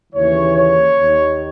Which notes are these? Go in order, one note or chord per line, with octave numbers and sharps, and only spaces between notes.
D#2 C#3 E3 C#5
C#5
D#2 D#3